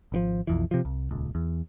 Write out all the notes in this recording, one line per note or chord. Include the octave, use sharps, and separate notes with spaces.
G#1 D3 F3
B1 F2 E3
C3 F3
C2
D#1 C#2
E2